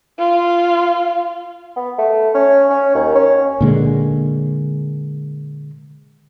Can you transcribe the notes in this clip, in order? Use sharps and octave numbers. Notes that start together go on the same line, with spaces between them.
F4
B3
A3
C#4
C#4
D#2
C#4
A#2 D3 G#3